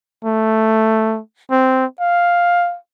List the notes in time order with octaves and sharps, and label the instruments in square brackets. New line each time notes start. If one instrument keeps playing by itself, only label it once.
[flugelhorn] A3
C4
F5